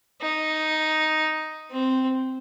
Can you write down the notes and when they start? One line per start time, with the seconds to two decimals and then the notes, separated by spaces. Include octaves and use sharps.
0.21 D#4
1.70 C4